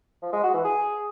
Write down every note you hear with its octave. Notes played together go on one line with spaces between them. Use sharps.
F3
G#3
F#4
E3
G#4